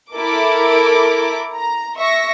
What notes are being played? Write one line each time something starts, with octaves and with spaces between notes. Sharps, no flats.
E4 A4 A#4 D6
A#5
E5 C#6 A#6